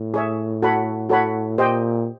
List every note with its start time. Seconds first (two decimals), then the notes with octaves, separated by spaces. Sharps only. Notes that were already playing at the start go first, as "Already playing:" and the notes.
Already playing: A2
0.14 G#4 C#5 E5
0.62 F#4 A4 C#5 F#5 B5
1.09 F#4 A4 C#5 F#5 B5
1.58 A#2 G4 C5 D#5 G5